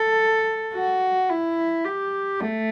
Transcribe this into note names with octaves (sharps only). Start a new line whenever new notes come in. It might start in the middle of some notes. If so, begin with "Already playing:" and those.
Already playing: A4
F#4
E4
G4
A3